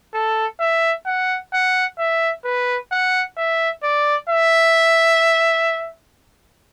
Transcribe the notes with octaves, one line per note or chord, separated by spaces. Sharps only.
A4
E5
F#5
F#5
E5
B4
F#5
E5
D5
E5